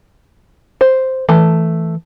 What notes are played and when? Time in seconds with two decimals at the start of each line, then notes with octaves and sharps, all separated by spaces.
0.81 C5
1.29 E3 A3